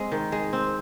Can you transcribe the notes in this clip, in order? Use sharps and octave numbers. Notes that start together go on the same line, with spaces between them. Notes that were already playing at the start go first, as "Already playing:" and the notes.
Already playing: G#3 C4
D#3
G#3
C4